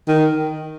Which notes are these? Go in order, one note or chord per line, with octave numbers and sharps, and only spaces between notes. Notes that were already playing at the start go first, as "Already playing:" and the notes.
D#3